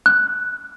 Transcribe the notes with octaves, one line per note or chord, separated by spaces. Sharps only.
F#6